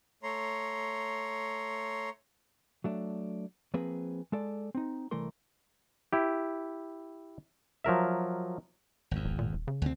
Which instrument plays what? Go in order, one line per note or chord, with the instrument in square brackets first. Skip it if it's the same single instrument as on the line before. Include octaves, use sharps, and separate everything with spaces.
[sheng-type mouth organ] A3 C#5 A#5 C6
[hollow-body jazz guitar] F#3 A3 D4
F3 A#3 C4 G#4 B4
G#3 A4 D5
C4 D#4
C2 E3 A3 A#4 C6
[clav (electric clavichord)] E4 G4
F3 F#3 A#4 E5
[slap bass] G#1 E2
[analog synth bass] D1
A#2
D#1
C#3
[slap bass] D2 C4